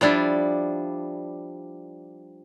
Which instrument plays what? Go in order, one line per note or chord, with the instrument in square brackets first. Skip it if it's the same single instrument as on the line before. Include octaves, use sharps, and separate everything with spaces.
[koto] F3 G3 D4 E4